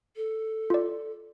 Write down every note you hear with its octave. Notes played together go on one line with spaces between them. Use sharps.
A4
F4 D5